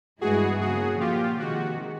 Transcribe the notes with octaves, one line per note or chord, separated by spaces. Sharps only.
G2 E3 G#3 B3 E4 F#4 G#4
C#3 F#3 A#3 F#4 G#4
A#2 F3 A#3 F4 G4
C3 D#3 G#3 F#4